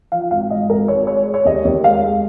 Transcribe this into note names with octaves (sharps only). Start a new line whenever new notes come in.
F3 F5
G#1 F5
G#2 D#5
G#1 A#4
G#1 C#5
G#3 C#5
G#3
C#5
D#2 D#5
D#2
G#3 F5
G#3